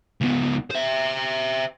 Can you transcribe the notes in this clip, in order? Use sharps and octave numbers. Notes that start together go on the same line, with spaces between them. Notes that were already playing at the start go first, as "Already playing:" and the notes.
C#2 B3
C5 E5